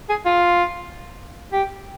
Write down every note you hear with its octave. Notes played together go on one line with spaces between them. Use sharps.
G#4
F4
G4